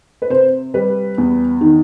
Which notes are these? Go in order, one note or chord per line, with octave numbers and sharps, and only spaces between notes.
B4
C3 C5
G3 B4
E2
D#3